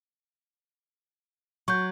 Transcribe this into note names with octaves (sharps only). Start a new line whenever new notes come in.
F#3 C#6 G6